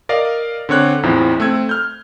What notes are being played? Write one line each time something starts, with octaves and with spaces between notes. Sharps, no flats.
A#4 D5 D#5 F5
D3 C4 C#5 F#6
A1 E2 F3 C4 D#4 E4
A3 C4 E6 G#6
F6 G6